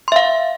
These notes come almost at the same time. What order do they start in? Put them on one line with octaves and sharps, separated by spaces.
C6 E5 F5